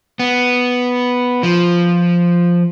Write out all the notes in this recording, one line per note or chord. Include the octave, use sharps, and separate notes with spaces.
B3
F3